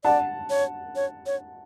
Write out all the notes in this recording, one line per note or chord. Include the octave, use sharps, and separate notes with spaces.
D5 F#5 A5
C#5
C#5
C#5